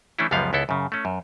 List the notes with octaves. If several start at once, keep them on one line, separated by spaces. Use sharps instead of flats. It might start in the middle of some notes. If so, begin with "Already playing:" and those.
E3 A3 C#4 D4 E4
C#2 F#2 F3 G3 B3 F5
C#2 B3 E4 A4
F#2 C#3
A3 C#4
F#2